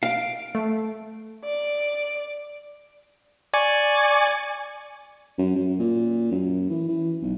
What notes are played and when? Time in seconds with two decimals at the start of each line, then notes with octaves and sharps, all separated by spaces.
0.03 F5 D7
0.55 A3
1.44 D5
3.54 D5 G#5 C#6
5.39 F#2
5.55 F#2
5.79 A#2
6.31 F#2
6.70 E3
6.88 E3
7.22 B1